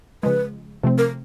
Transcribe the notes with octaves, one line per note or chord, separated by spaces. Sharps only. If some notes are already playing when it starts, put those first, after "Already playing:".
C#3 F3 G#3 B4
C3 F3 A3 C4
A#4